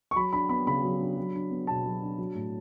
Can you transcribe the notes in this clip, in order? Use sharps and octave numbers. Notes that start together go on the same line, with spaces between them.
C#6
F#3 B5
D4 B5
B3 B5
C#3 B5
F#3
D4
F#3
D4
B3
B2 A5
F#3
D4
F#3
A2